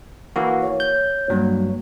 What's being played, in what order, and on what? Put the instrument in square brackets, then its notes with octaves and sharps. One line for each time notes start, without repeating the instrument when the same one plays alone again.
[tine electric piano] E3 A#3 F#4
[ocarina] C#5
[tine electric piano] G6
[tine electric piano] G2 F#3 [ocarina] A#3